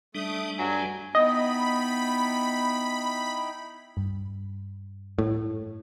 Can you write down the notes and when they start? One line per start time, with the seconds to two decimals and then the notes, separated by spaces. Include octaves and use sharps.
0.15 G3 A3 D4 D#6
0.59 G2 F#3 G#5
1.15 B3 D#4 E4 D#5 G5 B5
3.97 G2
5.19 A2